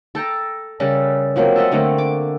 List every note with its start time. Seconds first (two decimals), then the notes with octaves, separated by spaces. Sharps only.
0.15 A4 G5 A5 A#5
0.80 C#3 G3 A4 A#4
1.36 F3 F#3 A#3 C4
1.56 A4 D#5 E5 F#5
1.72 D3 A3 A#3 C4
1.98 D6